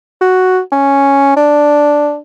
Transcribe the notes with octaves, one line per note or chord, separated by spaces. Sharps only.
F#4
C#4
D4